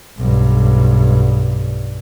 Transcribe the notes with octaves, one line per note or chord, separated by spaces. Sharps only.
B1 G2